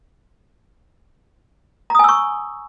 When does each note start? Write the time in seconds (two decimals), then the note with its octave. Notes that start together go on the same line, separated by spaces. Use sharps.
1.90 A#5
1.95 D#6
1.99 G#5
2.04 E6
2.09 C#6